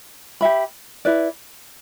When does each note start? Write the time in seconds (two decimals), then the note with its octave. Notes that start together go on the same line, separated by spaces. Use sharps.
0.41 G4 E5 B5
1.05 E4 B4 D5